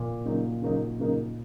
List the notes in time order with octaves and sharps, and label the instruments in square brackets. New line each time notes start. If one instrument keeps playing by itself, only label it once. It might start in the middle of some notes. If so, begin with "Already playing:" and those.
Already playing: [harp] A#2
[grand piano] C#3 F#3 A#3 D#4
C#3 F#3 A#3 D#4
C#3 F#3 A#3 D#4